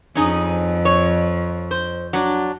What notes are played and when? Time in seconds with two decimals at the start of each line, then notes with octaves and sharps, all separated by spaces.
0.15 F2 C#4 D#4 G#4
0.85 C#5
1.71 C5
2.13 F#3 D4